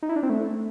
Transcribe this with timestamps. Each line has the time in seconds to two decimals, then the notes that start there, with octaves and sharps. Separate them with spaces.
0.03 D#4
0.09 E4
0.16 D4
0.23 C4
0.30 A3